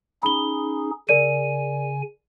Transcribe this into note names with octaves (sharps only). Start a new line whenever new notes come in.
C#4 D#4 G#4 B5 G7
C#3 A#4 D5 G#5 D#7